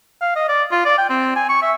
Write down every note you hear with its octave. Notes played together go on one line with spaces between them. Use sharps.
F5
D#5
D5
F4
D5
G5
C4
G#5
C#6
E5